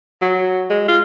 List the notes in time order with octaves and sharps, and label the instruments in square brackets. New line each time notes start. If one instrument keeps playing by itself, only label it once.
[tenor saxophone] F#3
G#3
F4